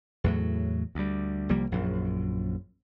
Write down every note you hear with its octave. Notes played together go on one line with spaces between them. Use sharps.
E2 A2 F#3
D2 G3
C2 F3 G3 A#3
A#1 F#2